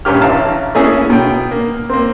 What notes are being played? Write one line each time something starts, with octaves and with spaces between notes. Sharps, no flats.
A#1 G2 C#4 G4 F6
A1 F5 A5
A3 A#3 C#4 E4 G#4
B2 G5
A#3
A#3 C4